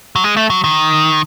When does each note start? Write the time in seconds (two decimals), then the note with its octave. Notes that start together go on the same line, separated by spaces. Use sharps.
0.16 F#3
0.24 G#3
0.37 A3
0.50 F#3
0.64 D#3